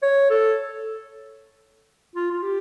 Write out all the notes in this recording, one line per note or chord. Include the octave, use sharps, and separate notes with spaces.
C#5
A4
F4
F4
G4